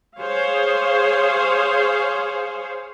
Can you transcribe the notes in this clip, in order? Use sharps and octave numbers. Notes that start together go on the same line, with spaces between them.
G#4 C5 C#5 F5